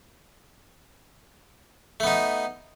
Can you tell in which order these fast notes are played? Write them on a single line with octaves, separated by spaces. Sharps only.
A3 B3 D#4